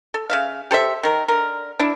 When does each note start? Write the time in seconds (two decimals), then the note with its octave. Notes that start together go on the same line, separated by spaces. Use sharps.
0.14 A4
0.30 C#3 E5 F5
0.71 G4 A4 C5 E5
1.03 D#3 A#4
1.28 D3 A#4
1.79 D4 E4